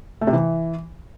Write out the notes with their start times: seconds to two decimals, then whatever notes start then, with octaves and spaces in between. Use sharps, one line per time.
0.21 A3
0.27 C3
0.33 E3